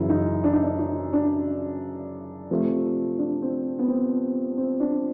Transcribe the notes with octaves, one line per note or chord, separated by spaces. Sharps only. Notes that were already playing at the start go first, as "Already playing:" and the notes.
Already playing: F#2 C#3 E3 E4
D#4
D4
D#4
D4
D#4
D4
C3 F3 A3
D4
C4
B3
C4
C4
D4